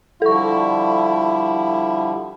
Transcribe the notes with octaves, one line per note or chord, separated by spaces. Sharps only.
D3 F3 G3 E4 A4 C#6